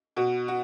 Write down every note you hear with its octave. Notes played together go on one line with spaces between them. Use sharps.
B2 F#4
F#4